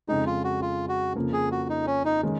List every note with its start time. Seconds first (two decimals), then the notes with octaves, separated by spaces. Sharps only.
0.08 F2 C#3 G#3 D#4
0.27 F4
0.44 F#4
0.62 F4
0.89 F#4
1.15 F2 C#3 F3 A#3
1.33 G#4
1.52 F#4
1.70 D#4
1.87 C#4
2.05 D#4
2.23 D#3 G#3 C#4